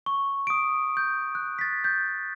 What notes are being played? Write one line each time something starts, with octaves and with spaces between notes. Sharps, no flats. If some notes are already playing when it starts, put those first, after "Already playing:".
C#6
D#6 D7
G6
F#6
A6 B6
G6